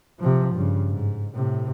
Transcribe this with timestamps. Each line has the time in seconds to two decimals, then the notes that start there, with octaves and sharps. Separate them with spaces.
0.19 C3 F3
0.55 G2 C#3
0.90 G#2
1.34 A2 C3